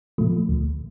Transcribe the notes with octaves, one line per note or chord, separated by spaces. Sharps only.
A#2 F3 A3
D2